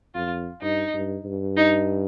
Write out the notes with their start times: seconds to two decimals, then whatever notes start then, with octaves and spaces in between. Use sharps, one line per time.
0.14 F2 F4
0.62 G2 D#4
0.94 G2
1.25 G2
1.57 D#4